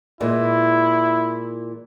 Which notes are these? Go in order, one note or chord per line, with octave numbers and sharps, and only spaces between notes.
A#2 E3 G#3 E4